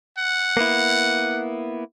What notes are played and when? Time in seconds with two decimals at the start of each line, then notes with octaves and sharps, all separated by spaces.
0.18 F#5
0.57 A#3 B3 E4